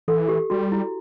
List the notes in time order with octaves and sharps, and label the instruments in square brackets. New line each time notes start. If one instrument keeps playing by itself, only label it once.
[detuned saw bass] E3 [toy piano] A4
[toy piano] G4
[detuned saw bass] G3 [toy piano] F#4
[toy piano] E4